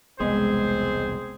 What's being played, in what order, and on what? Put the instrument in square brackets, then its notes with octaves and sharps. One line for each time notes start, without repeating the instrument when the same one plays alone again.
[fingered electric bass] E1 C2 B3 [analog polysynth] G#3 [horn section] C4 G#4 C5